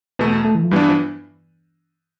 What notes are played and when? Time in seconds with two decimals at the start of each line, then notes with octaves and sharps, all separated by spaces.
0.19 E2 B2 A3 B3
0.45 A3
0.55 E3
0.64 F3
0.71 G2 E3 G3 B3 D4
0.89 F3